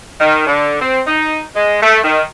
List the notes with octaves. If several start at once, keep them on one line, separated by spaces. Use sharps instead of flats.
D#3
D3
C4
D#4
G#3
A3
D#3